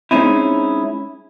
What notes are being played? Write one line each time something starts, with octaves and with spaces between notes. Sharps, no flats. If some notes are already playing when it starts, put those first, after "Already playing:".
G#3 C4 C#4 D#4 E4